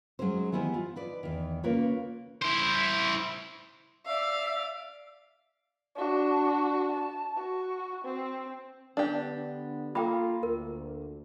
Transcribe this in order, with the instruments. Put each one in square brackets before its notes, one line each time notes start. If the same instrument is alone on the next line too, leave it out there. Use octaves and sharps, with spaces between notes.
[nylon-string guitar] F#3 G#3 C#4 D#4 C5
D#3 E3 B3 E4 G4 G#5
F4
D#4 B4 D5
E2 D#3
C#3 A#3 F4 A#4 B4 C#5
[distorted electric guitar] E4 C5
[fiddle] D5 F5 [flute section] E5 E6
[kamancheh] D4 F#4
A5
F#4
C4
[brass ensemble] D3 B3 [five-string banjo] D4 G4
[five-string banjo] A#3 [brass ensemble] F4 [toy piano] A4 G5 B5
[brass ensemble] D2 [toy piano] A#4